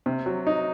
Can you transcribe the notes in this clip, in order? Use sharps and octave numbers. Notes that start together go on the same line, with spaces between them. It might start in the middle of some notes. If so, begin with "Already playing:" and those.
C3
F#3
D#4